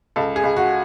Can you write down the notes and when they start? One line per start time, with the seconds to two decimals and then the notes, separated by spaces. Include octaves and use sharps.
0.16 C#2 A4
0.36 G#4
0.44 C#2
0.57 F#4